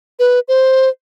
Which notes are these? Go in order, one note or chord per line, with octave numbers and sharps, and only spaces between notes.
B4
C5